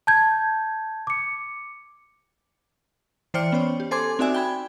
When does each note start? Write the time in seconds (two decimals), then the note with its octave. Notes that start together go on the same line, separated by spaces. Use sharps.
0.07 A5 G6 G#6
1.07 D6 C#7
3.34 E3 C5 D5 G5 F6 C#7
3.52 B3 C#4 C5 C#5
3.80 G4
3.91 A4 C5 G#5 C6 D6 G#6
4.19 C4 D#4 F#4 D5 E5 G#5
4.34 G5 B5 G#6